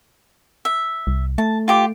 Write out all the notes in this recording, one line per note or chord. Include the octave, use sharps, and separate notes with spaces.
E5
C2
A3 A5
F4 G4 D6